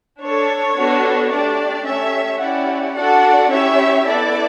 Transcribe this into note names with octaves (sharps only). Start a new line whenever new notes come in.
D4 A4 C#5
B3 D4 F#4 A4
A3 D4 G4 D5
A3 C#4 G4 C#5 E5
C#4 E4 G4 D5 F#5
D4 F#4 A4 D5 F#5
C#4 E4 G4 C#5 E5
B3 E4 A4 D5